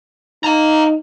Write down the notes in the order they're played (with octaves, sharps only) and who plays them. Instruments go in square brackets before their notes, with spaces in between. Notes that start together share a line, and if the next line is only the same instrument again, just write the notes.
[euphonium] D#4 [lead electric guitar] F5 A#5